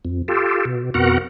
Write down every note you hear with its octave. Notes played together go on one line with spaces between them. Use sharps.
F2
F4 G4 A4
B2
F2 B2 B3 F#4 A#4 F#5